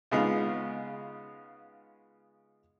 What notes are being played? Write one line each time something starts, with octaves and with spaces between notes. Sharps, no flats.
C#3 G#3 B3 D#4 F4